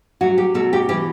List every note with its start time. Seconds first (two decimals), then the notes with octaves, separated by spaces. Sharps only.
0.21 F#3 F#4
0.38 G4
0.54 B2 A4
0.73 G4
0.89 E3 G4